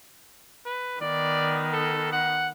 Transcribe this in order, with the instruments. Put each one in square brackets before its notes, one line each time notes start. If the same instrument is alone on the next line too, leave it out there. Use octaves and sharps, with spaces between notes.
[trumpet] B4
[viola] D#3 B3 [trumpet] D5
[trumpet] A4
F#5